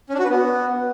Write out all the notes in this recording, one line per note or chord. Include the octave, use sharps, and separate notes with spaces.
C#4
D4
F#4
B4
B3